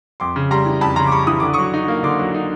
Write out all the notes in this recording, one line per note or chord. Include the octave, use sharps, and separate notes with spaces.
F2 C6 D6
C#3
G3 A#5 C6
E3
F2 A5 B5
C#3 A#5 C6
D6
G3 B5 C#6
E3 D#6
D3 D6
F#3 C#6 D#6
D#4
A#3
D3 C6 D6
F#3
D#4